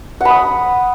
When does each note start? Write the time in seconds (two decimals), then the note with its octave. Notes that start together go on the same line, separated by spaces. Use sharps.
0.21 F#5
0.25 B5
0.30 D#6